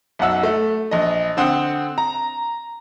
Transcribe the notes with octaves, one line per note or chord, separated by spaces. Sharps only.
B1 F#2 F#5 E6
A3
A#1 D#5
D3 C4 F#5 D#6
A#5